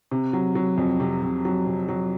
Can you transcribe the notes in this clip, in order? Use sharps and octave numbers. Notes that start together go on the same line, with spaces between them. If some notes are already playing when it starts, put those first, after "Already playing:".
C3
F#3
F#3
F2
C3
C3
F#3
C3
F#3